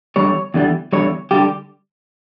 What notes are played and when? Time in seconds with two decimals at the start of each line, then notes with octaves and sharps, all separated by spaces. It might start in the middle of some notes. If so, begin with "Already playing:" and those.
0.16 E2 D3 G3 C#5
0.54 E2 D3 G3
0.93 E2 D3 G3 C#5
1.31 D3 G3 G4